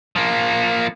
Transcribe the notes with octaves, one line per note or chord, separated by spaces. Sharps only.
F3 A#3